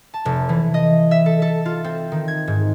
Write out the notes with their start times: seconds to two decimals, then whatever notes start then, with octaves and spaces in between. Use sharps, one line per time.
0.14 A5
0.25 F1
0.49 E3
0.74 D#5
1.11 E5
1.26 A4
1.42 A4
1.65 F4
1.84 C4
2.12 D#3
2.28 G#6
2.47 G#2